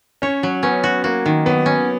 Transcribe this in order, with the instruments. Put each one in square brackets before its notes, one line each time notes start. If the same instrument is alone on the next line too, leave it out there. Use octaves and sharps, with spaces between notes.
[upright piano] C#4 [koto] C#5
[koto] F#3
[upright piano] B3 [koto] C#4
[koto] F#4
[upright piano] A#3 [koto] F#4
[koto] D#3
[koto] F#3 [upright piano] B3
[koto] C#4